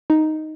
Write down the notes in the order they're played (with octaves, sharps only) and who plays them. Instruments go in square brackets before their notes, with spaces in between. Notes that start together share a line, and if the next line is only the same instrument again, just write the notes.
[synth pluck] D#4